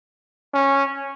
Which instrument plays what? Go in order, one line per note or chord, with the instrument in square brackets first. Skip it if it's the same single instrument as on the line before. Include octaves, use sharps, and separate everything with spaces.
[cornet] C#4